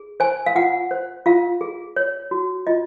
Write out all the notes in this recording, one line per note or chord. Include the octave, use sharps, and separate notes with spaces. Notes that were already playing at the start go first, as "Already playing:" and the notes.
Already playing: G#4
C5 G#5
F5
F4 F#5
C5
F4 F5
G#4
C#5
F#4
F4 D#5